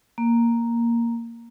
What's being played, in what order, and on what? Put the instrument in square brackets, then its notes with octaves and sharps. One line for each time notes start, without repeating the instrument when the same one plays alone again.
[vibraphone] A#3